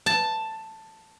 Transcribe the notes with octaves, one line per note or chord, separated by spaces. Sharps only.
A5